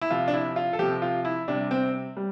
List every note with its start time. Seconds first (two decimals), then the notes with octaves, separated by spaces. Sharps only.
0.02 E4
0.10 C3 F3 F4
0.28 D4
0.34 E4
0.56 F4
0.73 A4
0.79 C3 F3 G4
1.02 F4
1.25 E4
1.48 C3 G3 D4
1.71 C4
2.17 G3